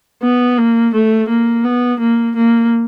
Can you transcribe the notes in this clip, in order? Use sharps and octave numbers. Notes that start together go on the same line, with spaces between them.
B3
A#3
A3
A#3
B3
A#3
A#3